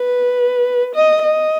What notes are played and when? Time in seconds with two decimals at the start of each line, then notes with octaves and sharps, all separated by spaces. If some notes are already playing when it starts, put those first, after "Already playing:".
Already playing: B4
0.95 D#5
1.23 D#5